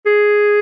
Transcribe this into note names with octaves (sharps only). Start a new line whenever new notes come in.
G#4